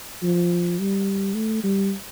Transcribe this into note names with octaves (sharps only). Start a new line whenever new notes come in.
F3
G3
A3
G3